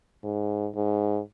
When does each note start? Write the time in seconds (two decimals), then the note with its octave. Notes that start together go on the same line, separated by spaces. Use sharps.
0.24 G#2
0.75 G#2